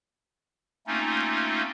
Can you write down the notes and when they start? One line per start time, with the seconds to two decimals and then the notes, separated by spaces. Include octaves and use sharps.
0.87 A3 A#3 C4 C#4 D#4 F4